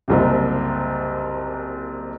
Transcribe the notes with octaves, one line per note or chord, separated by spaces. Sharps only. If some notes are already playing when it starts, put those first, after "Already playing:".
F#1 C2 C3